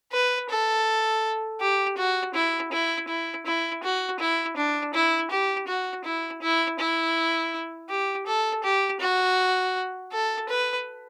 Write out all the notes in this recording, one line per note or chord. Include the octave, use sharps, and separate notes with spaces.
B4
A4
G4
F#4
E4
E4
E4
E4
F#4
E4
D4
E4
G4
F#4
E4
E4
E4
G4
A4
G4
F#4
A4
B4